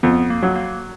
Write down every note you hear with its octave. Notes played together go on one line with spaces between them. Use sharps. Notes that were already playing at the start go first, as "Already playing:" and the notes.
F2 B3
A#3
F#3
A#3